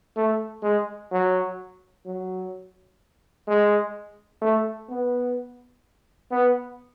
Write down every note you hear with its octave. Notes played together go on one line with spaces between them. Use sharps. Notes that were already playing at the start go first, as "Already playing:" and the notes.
A3
G#3
F#3
F#3
G#3
A3
B3
B3